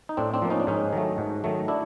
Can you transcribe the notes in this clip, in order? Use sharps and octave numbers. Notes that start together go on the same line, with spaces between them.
D#4
A2 C4 D4
C4 D4
F3 A#3
C#4 D#4
D4
G#2 C#4 D#4
D#3 F#3 A3
G#2
D#3 F#3 A3
D4 E4